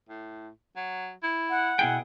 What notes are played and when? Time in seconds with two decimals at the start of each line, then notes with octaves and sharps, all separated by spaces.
0.09 A2
0.76 F#3
1.23 E4
1.50 F#5
1.79 B2 E4 G#4 G5